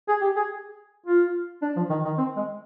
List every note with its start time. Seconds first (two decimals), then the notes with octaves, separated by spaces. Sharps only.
0.08 G#4
0.21 G4
0.36 G#4
1.06 F4
1.62 D4
1.76 F3
1.90 D#3
2.05 D#3
2.18 C4
2.37 G#3